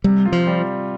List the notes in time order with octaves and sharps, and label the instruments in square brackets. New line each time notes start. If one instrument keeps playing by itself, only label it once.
[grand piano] C3 [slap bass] G3
[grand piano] F4
[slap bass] F3
[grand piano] G3